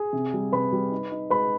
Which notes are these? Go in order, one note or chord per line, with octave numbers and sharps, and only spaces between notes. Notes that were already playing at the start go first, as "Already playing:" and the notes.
Already playing: G#4 G#5
C3
G3
C3 B4 B5
G3
D#4
D#4
G#3 B4 B5